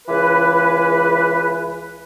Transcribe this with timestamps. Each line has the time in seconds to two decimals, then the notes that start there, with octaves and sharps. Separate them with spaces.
0.08 C#2 E3 B4